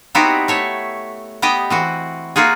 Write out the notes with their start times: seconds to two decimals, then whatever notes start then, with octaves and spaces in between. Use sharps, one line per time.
0.15 B3 C4 D#4 E4 F#4 G4
0.48 A3 C#5 E5
1.42 B3 G4 D#5 G5
1.70 E3 C4 F#4
2.36 A#3 F4 F#4 G#4